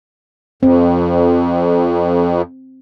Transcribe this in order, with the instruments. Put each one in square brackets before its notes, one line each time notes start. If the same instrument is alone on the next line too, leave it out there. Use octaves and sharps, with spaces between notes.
[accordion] F2 [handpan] C4